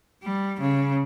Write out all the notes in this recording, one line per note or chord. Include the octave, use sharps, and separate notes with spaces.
G3
C#3